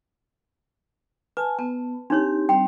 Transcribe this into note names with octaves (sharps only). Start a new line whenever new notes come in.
B4 G#5 A5
B3 A5
C4 D4 D#4 G4 C#5
G3 C4 G5